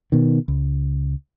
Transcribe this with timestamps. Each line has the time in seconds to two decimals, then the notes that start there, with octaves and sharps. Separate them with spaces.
0.12 B2 D#3
0.48 C#2